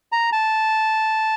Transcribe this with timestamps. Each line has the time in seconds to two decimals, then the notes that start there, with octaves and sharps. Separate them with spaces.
0.12 A#5
0.33 A5